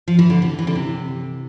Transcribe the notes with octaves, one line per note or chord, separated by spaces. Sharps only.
F3
E3
D3
C3
E3
D3
C3